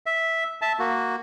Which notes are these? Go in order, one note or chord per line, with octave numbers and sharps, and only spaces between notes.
E5
E5 A5
A#3 F#4